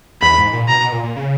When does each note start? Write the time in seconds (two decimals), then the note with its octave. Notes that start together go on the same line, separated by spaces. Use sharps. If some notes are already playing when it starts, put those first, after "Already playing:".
0.22 E2 B5
0.37 G#2
0.53 A#2
0.68 B2 A#5
0.81 B2
0.92 A#2
1.03 A#2
1.16 C#3